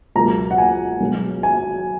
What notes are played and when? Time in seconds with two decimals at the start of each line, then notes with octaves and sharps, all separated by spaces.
0.16 C#2 B2 F#3 A#3 A#5
0.51 F#5
0.58 G#5
1.01 B1 B2 G#3
1.43 G#5